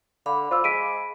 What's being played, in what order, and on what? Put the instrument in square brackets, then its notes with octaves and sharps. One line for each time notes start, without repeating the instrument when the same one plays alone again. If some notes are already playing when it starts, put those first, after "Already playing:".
[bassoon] D3 [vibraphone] F5 B5 D6
[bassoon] F4 [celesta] C5 E6
[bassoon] G#3 [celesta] B6 D7 D#7